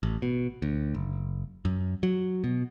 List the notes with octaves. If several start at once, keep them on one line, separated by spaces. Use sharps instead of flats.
A1
B2
D2
F#1
F#2
F#3
B2